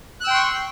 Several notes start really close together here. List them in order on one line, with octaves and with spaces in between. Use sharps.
F#6 E6 G5 C6 C#6